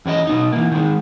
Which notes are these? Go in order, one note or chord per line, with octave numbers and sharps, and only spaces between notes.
E2 C#4 D4 D#5
B2 B3 D#4
E3 A#3
D#3 G#3